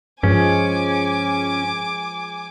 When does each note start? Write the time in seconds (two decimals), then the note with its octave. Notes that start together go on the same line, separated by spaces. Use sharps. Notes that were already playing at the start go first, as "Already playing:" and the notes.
0.23 G2 F3 G#3 C#4 G#4 G#5 D6